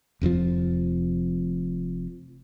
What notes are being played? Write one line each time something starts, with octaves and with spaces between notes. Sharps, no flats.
F1 F2 C3 F3